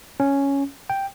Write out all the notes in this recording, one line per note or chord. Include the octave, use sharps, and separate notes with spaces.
C#4
G5